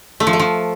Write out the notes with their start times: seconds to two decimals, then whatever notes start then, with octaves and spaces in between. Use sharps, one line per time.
0.20 A3
0.27 F3
0.33 A3
0.40 F3